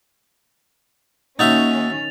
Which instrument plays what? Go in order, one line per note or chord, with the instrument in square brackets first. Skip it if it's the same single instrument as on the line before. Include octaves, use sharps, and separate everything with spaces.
[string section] D#3 C#4 [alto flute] A#3 [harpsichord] D#4 F#4 E5 [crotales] A6 F7